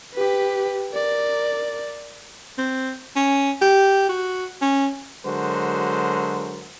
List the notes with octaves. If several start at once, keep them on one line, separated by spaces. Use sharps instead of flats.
G4 B4
A#4 D5
C4
C#4
G4
F#4
C#4
D3 F#3 G#3 F#4 A#4 C5